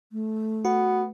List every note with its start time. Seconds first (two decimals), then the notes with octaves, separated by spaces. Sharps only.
0.12 A3
0.65 B3 F#4